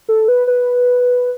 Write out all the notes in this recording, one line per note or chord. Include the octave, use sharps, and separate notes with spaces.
A4
B4
B4